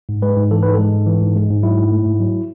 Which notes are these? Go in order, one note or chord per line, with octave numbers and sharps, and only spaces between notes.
G#2
G#3 B4
G#2
E3 A4
G#2 B4
G#3 A4
G#2
E3
G#2
G#3
G#2
F#3 E4
G#2
A3
G#2
F#3